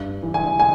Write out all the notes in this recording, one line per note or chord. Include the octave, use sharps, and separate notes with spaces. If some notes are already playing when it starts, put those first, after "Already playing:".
Already playing: G2
E3
G#5
G#5